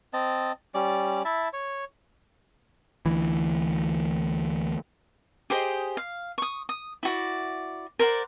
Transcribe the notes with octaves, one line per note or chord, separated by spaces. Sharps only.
C4 D#5 A5
G3 C#4 D5
E4 E5 A5
C#5
D2 E3
G4 G#4 C5 D#5
F5
C#6 D#6
D#6
E4 F#4 D5
A#4 C5 D5 F#5